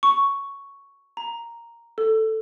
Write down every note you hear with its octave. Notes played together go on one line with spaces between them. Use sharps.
C#6
A#5
A4